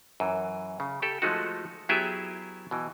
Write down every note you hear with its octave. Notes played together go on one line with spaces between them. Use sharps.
F#2 E3
C#3
G4 A4
F3 G#3 A3 D#4 F#4
F#3 B3 E4 G4 G#4 E5
B2 E3